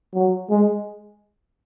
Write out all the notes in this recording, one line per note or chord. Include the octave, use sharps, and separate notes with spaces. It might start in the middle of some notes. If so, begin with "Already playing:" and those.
F#3
G#3